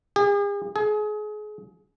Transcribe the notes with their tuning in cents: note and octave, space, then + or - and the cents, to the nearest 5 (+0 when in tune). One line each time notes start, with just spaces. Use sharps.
G#4 -45
G#4 +30